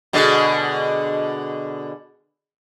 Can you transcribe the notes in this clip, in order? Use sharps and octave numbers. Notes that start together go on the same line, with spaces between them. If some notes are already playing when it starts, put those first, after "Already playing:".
B2 D3 G#3